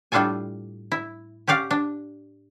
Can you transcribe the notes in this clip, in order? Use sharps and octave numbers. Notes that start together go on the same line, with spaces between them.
A2 G3 D4 F4 A4 G#5
E4
C#4 G4 D5 F5 F#5
D4